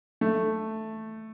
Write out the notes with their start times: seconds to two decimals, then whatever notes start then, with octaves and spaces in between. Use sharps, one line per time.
0.21 A3